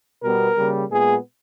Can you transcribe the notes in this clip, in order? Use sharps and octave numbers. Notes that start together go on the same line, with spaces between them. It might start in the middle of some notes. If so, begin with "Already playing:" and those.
B2 G3 B3 A#4
C#3 G3 A#3
A#2 G#3 B3 G#4